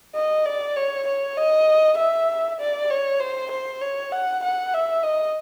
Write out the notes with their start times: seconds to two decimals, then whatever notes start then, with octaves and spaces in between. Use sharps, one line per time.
0.15 D#5
0.46 D5
0.76 C#5
1.07 C#5
1.37 D#5
1.98 E5
2.60 D5
2.90 C#5
3.20 C5
3.51 C5
3.82 C#5
4.12 F#5
4.43 F#5
4.74 E5
5.04 D#5